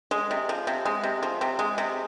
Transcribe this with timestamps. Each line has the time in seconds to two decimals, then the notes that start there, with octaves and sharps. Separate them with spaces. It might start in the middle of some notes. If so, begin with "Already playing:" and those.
0.11 G#3
0.31 C3
0.49 F3
0.67 C3
0.86 G#3
1.03 C3
1.23 F3
1.41 C3
1.59 G#3
1.78 C3